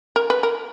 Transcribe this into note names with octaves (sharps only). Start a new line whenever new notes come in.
A#4
B4
A#4